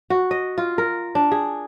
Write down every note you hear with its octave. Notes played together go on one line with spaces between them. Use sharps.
F#4
D#5
F4
A#4
D4
G#4